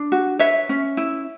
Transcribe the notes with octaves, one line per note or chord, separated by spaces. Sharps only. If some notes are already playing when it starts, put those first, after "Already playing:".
Already playing: D4
F#4
B4 C#5 E5
C#4
E4